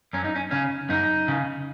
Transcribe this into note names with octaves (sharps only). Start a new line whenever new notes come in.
F#2 C#4
D#4
C#4
C#3 C#4
F#2 D#4
C#3